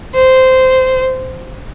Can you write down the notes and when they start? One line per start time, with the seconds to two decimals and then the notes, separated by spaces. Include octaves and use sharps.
0.14 C5